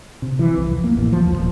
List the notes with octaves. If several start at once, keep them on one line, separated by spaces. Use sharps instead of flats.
C3
E3
C2
F2
A#3
A1
F3
D#2
D#1